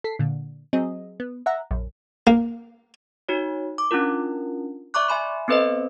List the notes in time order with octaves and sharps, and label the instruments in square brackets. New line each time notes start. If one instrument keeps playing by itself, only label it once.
[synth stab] A4 B6 C7
A#2 D3
F#3 C4 G#4 D#5
B3
E5 F#5 A#5
A#1 F#2
[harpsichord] A#3
[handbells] D#4 F#4 C#5
D6
C#4 D4 E4 F4 A#4
D5 E5 A#5 C#6 D6 F#6
E5 G#5 B5 C6
B3 C4 A4 B4 C5 D#5